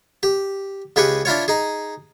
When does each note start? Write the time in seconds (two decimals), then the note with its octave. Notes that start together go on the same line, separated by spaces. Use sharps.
0.23 G4
0.96 C#2 G4 G#4 B4 G5 C#6
1.25 D4 E4 F4 C#5
1.48 D#4 G#4